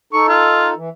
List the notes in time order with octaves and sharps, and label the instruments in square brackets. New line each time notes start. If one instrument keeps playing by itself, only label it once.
[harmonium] D#4 A4 [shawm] C#6
[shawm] F4
[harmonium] E3